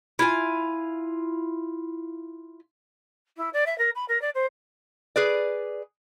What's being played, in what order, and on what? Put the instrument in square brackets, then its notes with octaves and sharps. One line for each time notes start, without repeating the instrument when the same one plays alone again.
[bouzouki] E4 F4 G#5
[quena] E4
D5
E5
A#4
B5
A#4
D5
C5
[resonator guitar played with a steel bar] G#4 B4 D5